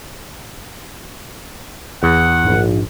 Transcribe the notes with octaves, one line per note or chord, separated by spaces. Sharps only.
E2 F#5
A#1 G#2